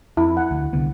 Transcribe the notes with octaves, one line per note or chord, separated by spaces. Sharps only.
F2 E4
F#5
D2
C2 D3 B3